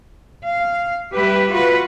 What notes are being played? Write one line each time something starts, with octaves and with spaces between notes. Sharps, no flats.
F5
G3 G4 B4 E5
F4 F#4 B4